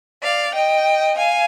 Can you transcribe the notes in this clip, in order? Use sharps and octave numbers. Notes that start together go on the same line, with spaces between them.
D5 F5
D#5 G5
F5 G#5